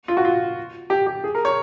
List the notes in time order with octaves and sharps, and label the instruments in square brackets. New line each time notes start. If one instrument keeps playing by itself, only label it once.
[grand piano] F4
F#4
F4
G4
G4
G#4
A#4
C#5